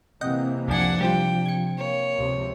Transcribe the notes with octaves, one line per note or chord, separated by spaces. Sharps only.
C3 E3 A#3 C4 D#5 F#5 G5
C2 F2 F3 D4 F#5 G#5
C3 G3 C4 F4 G5
G#6 C#7
A#3 C#5
C#2 C3 F3